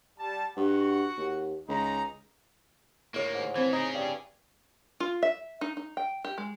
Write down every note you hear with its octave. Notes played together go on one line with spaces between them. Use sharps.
G3 A5
G2 F#4 F#5
D#2
C#2 D#4 A#5
A2 D#3 A#3 C#5
G#2
E3 C4 C5
C#4 D#4 G#4
G2
F4
E5
D#4
D#4
G5
G4
G#3